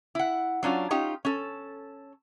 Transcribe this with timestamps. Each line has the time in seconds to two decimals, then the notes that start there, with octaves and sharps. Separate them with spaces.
0.15 E4 F#5
0.63 F#3 C#4 D4 F4
0.91 C#4 D#4 F4 G4
1.25 C#4 A4